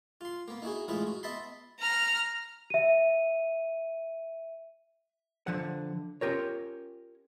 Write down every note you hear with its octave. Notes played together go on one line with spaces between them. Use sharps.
F4 C6
A#3 B3
D#4 E4 F#4 G#4
A1 G#3 E4 F4 G#4 B4
F#4
B3 D#5 E5 A5 B5 C6
A#5 F6
E5 D#7
D3 F3 F#5
C#4 F4 G4 A#4 C#5